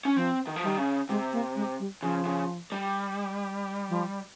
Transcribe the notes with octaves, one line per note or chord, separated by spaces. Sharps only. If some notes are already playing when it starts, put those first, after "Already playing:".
C#4
F3 C4
D#3
F3
D#3 G3
C#3
C3 G#3
A#3
G#3
G3
C#3 F3
C#3
G3
F3